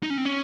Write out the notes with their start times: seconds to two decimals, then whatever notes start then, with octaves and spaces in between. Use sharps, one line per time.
0.03 D#4
0.10 C#4
0.18 C4
0.25 C#4